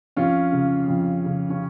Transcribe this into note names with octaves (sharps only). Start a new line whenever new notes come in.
F2 C#4 F4
C#3
F2
C#3
C#4